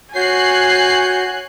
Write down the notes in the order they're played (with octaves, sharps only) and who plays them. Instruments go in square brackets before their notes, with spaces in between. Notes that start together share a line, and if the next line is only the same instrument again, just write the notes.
[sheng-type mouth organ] F#4 C#5 G6 [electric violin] G#5 [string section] F#6 C7